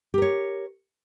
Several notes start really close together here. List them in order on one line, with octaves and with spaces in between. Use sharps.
G4 A#4 C#5